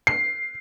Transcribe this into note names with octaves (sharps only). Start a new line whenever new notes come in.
C7